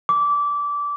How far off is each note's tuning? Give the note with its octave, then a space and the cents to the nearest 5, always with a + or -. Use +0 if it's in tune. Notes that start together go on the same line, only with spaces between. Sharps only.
D6 -20